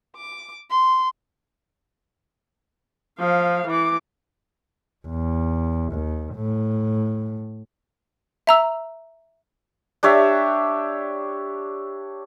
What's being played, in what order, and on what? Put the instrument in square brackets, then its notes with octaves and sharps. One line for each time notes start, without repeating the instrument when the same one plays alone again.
[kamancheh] D6
C6
[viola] F3 F5
E3 D6
[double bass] E2
D#2
A2
[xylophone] E5 A#5 E6
[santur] D4 G4 C#5 E5